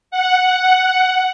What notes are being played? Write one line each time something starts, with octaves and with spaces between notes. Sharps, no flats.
F#5